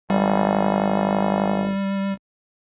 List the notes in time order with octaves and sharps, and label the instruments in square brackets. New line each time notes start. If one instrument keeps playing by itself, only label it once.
[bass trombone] G#1 [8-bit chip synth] G3